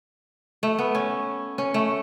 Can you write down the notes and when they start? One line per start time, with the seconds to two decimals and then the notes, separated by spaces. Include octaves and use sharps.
0.63 A3
0.78 B3
0.95 C#4
1.58 C#4
1.74 A3